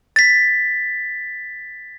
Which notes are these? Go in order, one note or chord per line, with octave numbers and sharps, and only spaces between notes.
A6 B6